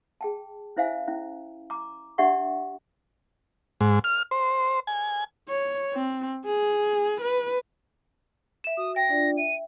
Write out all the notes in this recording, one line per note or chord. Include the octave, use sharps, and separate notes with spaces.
G#4 G5 A5
C#4 E4 C5 E5 F5 G#5
C#4 E4
A#5 D6
D4 G4 D5 E5 F#5 C#6
G#2
F6
C5
G#5
C#5
C4
G#4
B4
E5 E7
F#4 D#6
G5 A#6
D4 F4 D5
E5 D#7